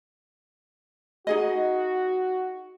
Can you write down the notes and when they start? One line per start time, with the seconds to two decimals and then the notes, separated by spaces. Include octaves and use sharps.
1.27 D#4 F#4 G#4 D#5